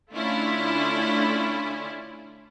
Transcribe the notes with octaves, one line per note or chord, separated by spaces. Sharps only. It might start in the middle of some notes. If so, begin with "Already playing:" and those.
D3 A3 C#4 D4 E4 F4